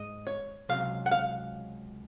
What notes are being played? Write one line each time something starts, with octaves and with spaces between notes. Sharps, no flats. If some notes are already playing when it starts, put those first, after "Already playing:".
Already playing: G#2 G#3 D#5
C#5
C#2 C3 F#3 F5
F#5
F5